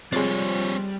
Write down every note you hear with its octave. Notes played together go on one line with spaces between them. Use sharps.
C3 F3 G3 G#3 C4 C#5 D5